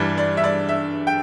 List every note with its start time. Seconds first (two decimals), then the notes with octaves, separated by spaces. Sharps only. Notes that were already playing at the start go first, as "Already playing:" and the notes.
Already playing: G2 E3 G3 D5
0.18 D5
0.37 E5
0.44 D5
0.69 E5
1.07 G5